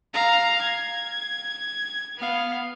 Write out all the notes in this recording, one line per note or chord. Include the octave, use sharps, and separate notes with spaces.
F5 A#5
G#6
B3 F5